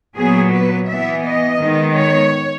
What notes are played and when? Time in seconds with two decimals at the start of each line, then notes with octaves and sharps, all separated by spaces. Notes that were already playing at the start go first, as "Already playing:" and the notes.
0.16 A#2 F#3 B3 G#4
0.52 B4
0.89 E3 B3 E5
1.25 D#5
1.60 D#3 G#3 B3
1.97 C#5